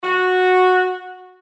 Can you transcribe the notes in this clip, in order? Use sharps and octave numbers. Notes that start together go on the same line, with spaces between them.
F#4